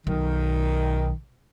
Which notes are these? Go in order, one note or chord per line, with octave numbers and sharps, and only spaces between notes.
B1 D#3